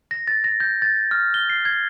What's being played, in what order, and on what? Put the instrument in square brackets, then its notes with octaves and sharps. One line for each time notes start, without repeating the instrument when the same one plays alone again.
[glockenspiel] A#6
A6
A#6
G6
A6
F6
G7
C7
G#6